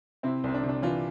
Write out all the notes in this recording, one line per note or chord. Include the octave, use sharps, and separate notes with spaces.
C3 C4 E4
C2 C4
D4
C3
D4
E3 D4 F4